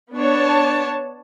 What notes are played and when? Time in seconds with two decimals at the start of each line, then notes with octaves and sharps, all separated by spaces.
0.16 B3 D4 C#5 A5